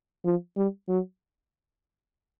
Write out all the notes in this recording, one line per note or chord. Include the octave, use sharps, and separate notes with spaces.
F3
G3
F#3